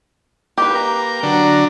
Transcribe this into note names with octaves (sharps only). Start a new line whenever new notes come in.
A#3 G4 B4 G5
A#5
D3 F#3 D4